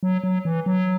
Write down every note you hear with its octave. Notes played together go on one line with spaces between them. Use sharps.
F#3
F#3
E3
F#3